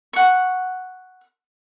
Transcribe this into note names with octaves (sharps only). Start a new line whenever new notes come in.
F#5 C#6